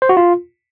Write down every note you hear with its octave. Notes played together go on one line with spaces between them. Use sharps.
C5
F#4
F4